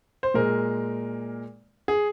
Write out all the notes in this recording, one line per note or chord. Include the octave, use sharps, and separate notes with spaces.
C5
A#2 G#3 A#4
G#4